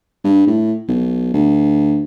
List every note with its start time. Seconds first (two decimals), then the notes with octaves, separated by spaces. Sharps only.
0.24 G2
0.47 A2
0.88 B1
1.34 D2